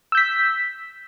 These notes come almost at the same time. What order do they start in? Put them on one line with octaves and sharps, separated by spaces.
E6 G6 B6